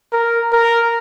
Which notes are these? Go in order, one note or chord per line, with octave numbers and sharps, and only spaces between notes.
A#4
A#4